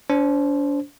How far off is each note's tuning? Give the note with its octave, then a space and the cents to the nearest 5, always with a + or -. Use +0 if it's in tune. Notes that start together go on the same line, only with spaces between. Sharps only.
D4 -40 C5 +0